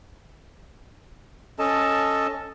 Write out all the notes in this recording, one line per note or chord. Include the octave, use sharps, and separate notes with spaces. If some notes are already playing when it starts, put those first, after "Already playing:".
C#4 A4 D#5 A5